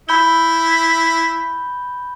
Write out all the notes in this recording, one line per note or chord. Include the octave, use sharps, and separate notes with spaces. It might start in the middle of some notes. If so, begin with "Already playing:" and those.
E4 B5 G6 G7